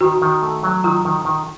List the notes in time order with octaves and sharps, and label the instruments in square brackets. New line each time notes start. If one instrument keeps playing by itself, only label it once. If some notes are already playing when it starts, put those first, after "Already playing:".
[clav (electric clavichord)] D#3 [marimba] F#4
[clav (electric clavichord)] D#3
A3
F#3
[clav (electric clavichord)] D#3 [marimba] F4
[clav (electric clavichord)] D#3
D#3